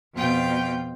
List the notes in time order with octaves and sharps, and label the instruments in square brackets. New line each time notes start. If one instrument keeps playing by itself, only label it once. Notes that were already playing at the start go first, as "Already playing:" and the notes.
[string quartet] F2 B2 F4 G5